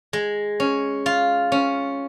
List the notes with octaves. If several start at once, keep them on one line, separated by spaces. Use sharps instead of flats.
G#3
C#4
F4
C#4